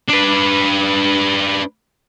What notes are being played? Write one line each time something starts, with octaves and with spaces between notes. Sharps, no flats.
D4 B4